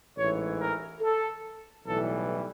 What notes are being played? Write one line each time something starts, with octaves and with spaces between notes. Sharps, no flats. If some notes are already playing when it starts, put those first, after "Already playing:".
A1 G#2 E3 C#5
A#4
A4
B1 A2 E3 G3 A4